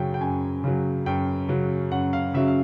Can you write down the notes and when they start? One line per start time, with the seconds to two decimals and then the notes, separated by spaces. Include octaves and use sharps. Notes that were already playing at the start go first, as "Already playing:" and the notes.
Already playing: F#2 C#3 F#3 G5
0.14 G5
0.20 F#2 G#5
0.64 C#3 F#3
1.06 F#2 G5
1.48 C#3 F#3
1.91 F#2 F#5
2.13 F5
2.34 C#3 F#3 E5
2.48 F5